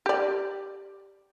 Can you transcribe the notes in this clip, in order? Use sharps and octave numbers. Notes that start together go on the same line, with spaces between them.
G4 D5